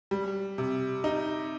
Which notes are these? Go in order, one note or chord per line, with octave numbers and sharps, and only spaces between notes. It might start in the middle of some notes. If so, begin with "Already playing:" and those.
G3
C3
D#4